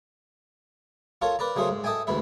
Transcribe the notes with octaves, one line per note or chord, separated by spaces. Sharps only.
F4 A4 A#4 C#5
A#4 B4 D5 A#5
C#3 F#3 A3 G#4 A#4 C5
G#2
A4 D#5 E5 G5 G#5
D2 G#2 E3 E4 E5